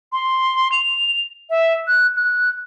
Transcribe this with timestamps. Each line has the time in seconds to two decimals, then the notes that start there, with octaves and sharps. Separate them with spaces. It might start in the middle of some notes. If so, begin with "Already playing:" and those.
0.13 C6
0.72 F7
1.50 E5
1.87 F#6
2.16 F#6